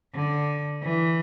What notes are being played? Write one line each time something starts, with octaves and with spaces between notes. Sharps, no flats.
D3
E3